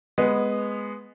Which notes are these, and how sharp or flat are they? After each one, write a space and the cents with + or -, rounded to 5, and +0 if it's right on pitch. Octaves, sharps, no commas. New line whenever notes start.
G#3 +0 B3 +0